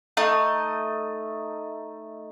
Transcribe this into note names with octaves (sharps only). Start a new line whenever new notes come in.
A3 D#4 D#5